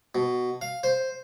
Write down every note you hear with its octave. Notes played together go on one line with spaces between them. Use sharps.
B2
F5
C5